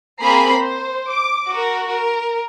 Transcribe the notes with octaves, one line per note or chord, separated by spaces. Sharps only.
A#3 C4 G#4 A#5 B5 C7
C5
D6
F#4 A#4
A#4